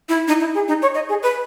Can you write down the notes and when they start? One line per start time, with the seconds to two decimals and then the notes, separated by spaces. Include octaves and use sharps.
0.09 E4
0.28 D#4
0.40 E4
0.55 G#4
0.68 D#4
0.82 C#5
0.95 D#5
1.09 G#4
1.23 B4